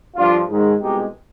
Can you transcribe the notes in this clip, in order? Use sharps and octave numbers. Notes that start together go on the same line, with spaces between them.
G2 D3 F3 D4 F4
G#2 D#3 G#3
C2 B2 G#3 D#4 G4